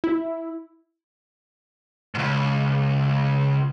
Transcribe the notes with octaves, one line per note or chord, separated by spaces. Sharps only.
E4
C#2 G#2